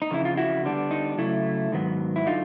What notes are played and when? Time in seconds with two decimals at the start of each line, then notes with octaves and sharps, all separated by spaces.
0.02 D#4
0.11 F2 C#3 E3 E4
0.25 F4
0.37 E4 F#4
0.64 D3 G3 B3 D4
0.91 D#4
1.18 C#3 F#3 A3 E4
1.72 G#2 D#3 F#3 B3
2.16 E4
2.26 D3 F#3 D#4 F4